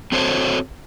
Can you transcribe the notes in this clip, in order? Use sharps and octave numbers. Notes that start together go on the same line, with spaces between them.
C4 F#4 A4 C5 C#5